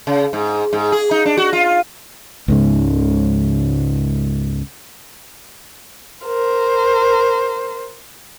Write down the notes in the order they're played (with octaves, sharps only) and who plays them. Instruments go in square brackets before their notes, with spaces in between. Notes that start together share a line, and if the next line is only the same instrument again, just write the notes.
[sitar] C#3
G#2
G#2
G#4
D#4
D4
F#4
F4
[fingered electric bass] C#2 G#2 C#3
[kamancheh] A#4 C5